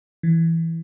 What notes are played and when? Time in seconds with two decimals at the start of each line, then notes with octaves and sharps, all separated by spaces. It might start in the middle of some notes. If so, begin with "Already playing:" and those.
0.23 E3